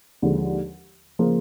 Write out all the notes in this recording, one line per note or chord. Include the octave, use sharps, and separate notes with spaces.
D#2 D3 F3 G#3
C#3 F3 A#3